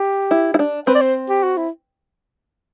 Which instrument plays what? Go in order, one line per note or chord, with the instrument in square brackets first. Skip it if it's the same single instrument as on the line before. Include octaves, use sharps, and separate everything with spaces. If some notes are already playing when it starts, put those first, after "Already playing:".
Already playing: [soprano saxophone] G4
[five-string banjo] E4
E4
D4
[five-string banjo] C4 [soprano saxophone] B4
[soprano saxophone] D5
C5
G4
F#4
E4